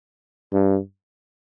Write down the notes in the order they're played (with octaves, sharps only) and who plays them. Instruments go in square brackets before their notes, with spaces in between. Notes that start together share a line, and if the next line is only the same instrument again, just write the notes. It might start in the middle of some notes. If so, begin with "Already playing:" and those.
[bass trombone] G2